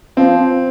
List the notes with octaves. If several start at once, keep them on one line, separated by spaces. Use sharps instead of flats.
F3 C4